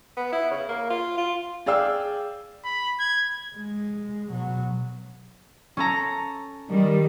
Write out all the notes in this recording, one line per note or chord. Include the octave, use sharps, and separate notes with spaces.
B3
E4
C#3
A#3
F4
F4
G#4 D5 F5 G5 E6
B5
G#6
G#3
B2 F#3
C#4 A4 A#5
D#3 G3